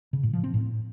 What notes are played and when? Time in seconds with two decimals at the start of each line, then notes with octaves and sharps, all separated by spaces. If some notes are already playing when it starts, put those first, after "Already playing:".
0.13 C#3
0.23 A2
0.33 F3
0.44 C4
0.54 A2